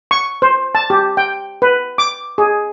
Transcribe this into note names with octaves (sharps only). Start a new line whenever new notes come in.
C#6
C5
A5
G4
G5
B4
D6
G#4